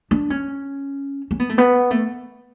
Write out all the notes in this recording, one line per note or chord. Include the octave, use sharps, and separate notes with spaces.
D4
C#4
C#4
B3
A3
B3
A3